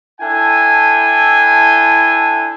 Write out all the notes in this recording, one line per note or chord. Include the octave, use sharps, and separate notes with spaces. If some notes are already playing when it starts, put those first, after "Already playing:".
D4 E4 A4 G5 G#5